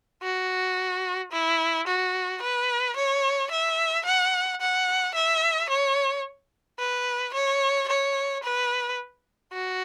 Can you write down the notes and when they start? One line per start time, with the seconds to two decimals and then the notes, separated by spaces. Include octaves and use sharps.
0.23 F#4
1.32 E4
1.87 F#4
2.42 B4
2.97 C#5
3.51 E5
4.06 F#5
4.61 F#5
5.15 E5
5.70 C#5
6.79 B4
7.34 C#5
7.88 C#5
8.44 B4
9.53 F#4